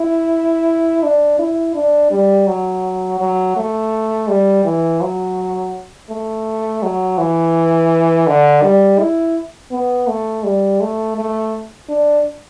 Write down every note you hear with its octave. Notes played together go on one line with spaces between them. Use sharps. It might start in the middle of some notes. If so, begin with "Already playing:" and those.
Already playing: E4
D4
E4
D4
G3
F#3
F#3
A3
G3
E3
F#3
A3
F#3
E3
D3
G3
E4
B3
A3
G3
A3
A3
D4